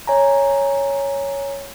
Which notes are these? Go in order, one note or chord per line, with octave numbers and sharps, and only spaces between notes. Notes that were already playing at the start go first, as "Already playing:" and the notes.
C#5 G#5 A#5